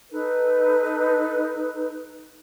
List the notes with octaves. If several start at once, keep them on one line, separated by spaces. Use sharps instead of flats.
D#4 A4 B4